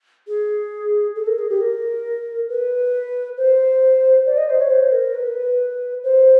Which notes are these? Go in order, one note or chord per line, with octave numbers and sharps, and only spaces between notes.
G#4
A4
A#4
G#4
G4
A#4
B4
C5
D5
D#5
C5
C#5
C5
A#4
B4
C5